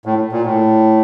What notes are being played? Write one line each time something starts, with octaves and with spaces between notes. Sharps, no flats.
A2
A#2
A2